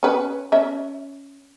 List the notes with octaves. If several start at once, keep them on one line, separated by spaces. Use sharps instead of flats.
C#4 B4
C#4 E5